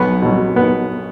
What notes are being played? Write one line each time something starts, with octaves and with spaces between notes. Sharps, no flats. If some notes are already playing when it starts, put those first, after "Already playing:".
Already playing: B1 B3
B2 F#3
B3